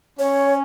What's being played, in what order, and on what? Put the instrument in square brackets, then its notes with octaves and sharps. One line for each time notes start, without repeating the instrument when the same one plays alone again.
[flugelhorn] C#4 [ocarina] C#5